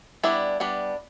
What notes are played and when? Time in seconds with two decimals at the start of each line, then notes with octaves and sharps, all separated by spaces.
0.23 G3 B3 D4 E4
0.60 G3 B3 D4